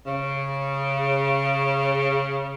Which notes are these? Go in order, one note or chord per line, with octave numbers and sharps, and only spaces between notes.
C#3